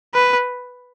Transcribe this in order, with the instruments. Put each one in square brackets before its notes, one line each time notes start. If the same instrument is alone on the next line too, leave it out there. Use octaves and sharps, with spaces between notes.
[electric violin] B4